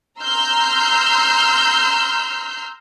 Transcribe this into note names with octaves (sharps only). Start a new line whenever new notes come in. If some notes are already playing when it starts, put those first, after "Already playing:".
A#5 C6 E6 F6 G6